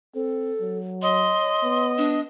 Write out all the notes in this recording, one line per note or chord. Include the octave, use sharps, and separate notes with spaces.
C4 A4
F#3
C#5 D#5 C6
B3
D4